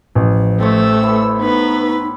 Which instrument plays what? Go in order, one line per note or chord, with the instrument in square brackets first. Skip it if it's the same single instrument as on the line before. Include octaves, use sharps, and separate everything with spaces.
[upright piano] A1 [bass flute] F3
[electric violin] A3 E6 [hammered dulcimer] C4 C#5
[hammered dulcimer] A2 E4 E5 [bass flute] B4
[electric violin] B3 B4 [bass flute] D#4